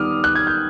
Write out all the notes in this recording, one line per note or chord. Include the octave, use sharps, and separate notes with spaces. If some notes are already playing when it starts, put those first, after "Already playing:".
Already playing: D#3 G3 B3 D6 D#6 F6
F#6
G#6
G6